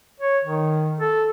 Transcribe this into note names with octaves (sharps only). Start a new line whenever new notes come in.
C#5
D#3
A4